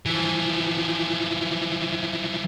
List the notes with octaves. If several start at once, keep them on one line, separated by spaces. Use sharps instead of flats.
E3 F3